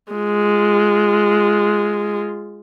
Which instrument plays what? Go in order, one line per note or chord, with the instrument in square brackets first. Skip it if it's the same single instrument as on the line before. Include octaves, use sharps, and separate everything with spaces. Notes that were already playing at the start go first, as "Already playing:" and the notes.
[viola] G#3 F4